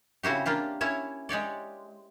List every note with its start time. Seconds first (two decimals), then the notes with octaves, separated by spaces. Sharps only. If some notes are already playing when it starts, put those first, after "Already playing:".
0.23 C#3 C4 E4 F#4 G4
0.46 A#3 D4 F4 G4
0.81 C#4 E4 C#5
1.29 G#3 G4 C#5 D5